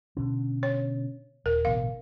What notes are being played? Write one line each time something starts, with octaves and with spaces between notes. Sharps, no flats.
B2 D3 C#4
C#5
D#1 A#4
A1 B2 D3 F5